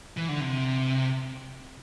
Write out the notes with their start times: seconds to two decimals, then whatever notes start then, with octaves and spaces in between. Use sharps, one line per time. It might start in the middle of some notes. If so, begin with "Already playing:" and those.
0.17 E3
0.29 D3
0.40 C3